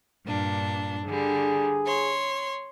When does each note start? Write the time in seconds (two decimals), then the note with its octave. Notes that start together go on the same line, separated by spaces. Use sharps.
0.25 G2 A#2 D4
1.06 D3 G3 G#4
1.84 C#5 C6